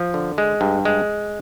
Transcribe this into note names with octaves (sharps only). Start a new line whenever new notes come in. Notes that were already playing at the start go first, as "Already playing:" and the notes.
Already playing: F3
D3
G#3
G2
G#3